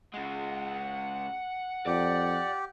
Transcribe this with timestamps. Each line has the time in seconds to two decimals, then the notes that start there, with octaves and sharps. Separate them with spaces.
0.14 C#3 G#3 F#5
1.87 F2 G4 D5